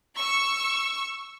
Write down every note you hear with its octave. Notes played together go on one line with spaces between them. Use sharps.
C#6 E6